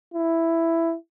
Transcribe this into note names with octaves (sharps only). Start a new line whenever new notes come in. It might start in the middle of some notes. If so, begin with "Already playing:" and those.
E4